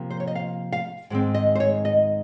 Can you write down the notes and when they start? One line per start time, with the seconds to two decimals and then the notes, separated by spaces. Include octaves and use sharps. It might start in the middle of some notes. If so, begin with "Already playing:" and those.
Already playing: C3 F3 A#3
0.10 C5
0.20 C#5
0.27 D#5
0.35 F5
0.72 F5
1.10 G#2 D#3 G#3 C4
1.34 D#5
1.55 C5
1.60 C#5
1.85 D#5